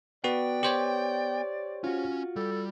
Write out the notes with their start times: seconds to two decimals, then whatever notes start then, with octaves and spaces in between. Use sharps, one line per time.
0.24 B3 F#4 B4 D5 G5
0.63 G4 C5 C#5
1.84 C#4 F4 F#4
2.36 G3 A4